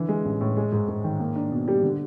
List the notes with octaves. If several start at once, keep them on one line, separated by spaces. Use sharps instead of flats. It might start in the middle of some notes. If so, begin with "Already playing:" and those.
Already playing: D3 E3
G#3
A1
A2
G#3
G#2
G#2
D#3
A#3
D4
B2
G3
D3